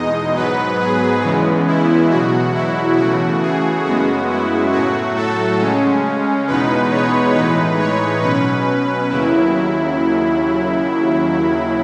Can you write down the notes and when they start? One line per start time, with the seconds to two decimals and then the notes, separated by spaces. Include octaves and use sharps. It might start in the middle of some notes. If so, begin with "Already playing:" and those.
Already playing: E2 B2 G#3 D#4 D#5
0.36 G#2 F#3 B3 B4
0.79 G#4
1.23 E2 C#3 E3 G#3 B3
1.67 E4
2.10 E2 B2 F#3 F#4
2.54 E4
2.98 C#3 E3 A3 F#4
3.42 G#4
3.85 F#2 C#3 G#3 B3 F#4
4.29 E4
4.72 A2 F#3 A3 F#4
5.16 A4
5.60 C#3 G#3 C#4
6.47 E2 B2 G#3 B3 D#4 B4
6.91 C#5
7.35 A2 E3 G#3 D#4 B4
7.79 C#5
8.22 B2 F#3 C#4 B4
9.10 D#2 C#3 F#3 E4